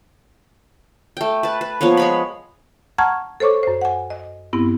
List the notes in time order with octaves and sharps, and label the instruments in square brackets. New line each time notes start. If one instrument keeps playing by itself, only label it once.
[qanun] A3 G5
B4 A5
B4
F3 A#3 B3 C#5
G#3 C#5 B5
[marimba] F#5 A5 A#5 C#6 F6 G#6
A4 C5 C#5 C#6 D6
F#2 C5
F#5 G#5
D#5
G2 B3 C4 E4